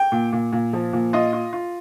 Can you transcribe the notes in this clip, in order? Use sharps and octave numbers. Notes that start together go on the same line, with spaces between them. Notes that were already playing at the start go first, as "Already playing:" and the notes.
Already playing: G5
A#2
A#2
A#2
F3
A#2
F4 D#5
F4
F4